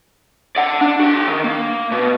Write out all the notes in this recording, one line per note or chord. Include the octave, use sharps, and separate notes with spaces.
D5 F#5
D4
F#4 G5
D#3
A#3
B2